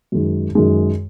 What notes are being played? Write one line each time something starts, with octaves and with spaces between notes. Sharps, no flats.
F#2 D#3 G#3
F#2 D#3 G#3